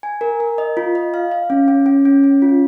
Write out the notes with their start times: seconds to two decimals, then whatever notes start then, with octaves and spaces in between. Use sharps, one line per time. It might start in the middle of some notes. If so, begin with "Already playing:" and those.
0.03 G#5
0.21 A#4
0.40 A#4
0.58 D#5
0.77 F4
0.95 D#5
1.14 F5
1.31 F5
1.50 C#4
1.68 C#4
1.86 C#4
2.05 C#4
2.24 C#4
2.42 F4